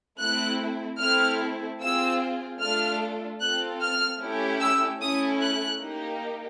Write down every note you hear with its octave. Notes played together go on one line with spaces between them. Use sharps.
A3 C4 E4 F#6
A3 C4 E4 A4 F6
C4 F4 G#4 E6
A3 D4 F4 A4 F6
C4 F4 A4 F#6
F6
A3 C#4 E4 G4
E6
A3 C#4 E4 A4 D#6
F#6
A#3 D#4 G4